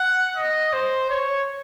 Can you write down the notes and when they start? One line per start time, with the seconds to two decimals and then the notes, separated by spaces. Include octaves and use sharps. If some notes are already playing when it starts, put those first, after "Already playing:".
Already playing: F#5
0.36 D#5
0.73 C5
1.10 C#5